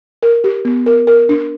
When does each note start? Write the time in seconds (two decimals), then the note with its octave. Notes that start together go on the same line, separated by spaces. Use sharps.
0.23 A#4
0.44 G4
0.65 B3
0.86 A#4
1.07 A#4
1.29 D4